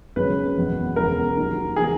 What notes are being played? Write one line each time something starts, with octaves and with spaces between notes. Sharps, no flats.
G#1 F#2 C#3 G#3 C#4 B4
F#1 E2 B2
E1 E2 C#3 G#3 A#4
D#2 D#3 F#3
C#3 E3 G#3 B3 G#4